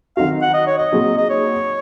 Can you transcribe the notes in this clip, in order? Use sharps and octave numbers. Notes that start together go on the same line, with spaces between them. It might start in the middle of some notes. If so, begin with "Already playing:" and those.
D#3 F#3 C4 D#4 F#4 F5
F#5
D#5
C#5
D#5
A#2 F#3 C4 D#4 G#4
D#5
C#5